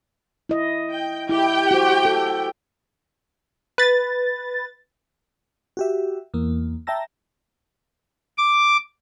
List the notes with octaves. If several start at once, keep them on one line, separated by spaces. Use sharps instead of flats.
E4 D#5
G5
E4 G4 G5
F#4 C5
A4
B4 A6
F#4 G4 E5
E2 A#3
E5 G5 A5 A#5 E6 A#6
D6